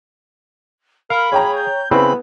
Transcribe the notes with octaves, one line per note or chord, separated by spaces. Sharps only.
A#4 F5 B5
G#4 C#5 G5 A#5
G6
C#3 B3 C4 E4 B4 B5